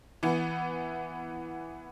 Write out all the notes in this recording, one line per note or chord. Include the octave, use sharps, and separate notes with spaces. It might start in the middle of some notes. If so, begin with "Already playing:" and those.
E3 B3